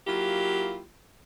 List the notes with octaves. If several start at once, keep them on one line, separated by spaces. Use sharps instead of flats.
F#3 A#3 E4 F4 G4